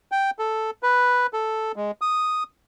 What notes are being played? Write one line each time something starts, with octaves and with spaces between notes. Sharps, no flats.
G5
A4
B4
A4
G#3
D#6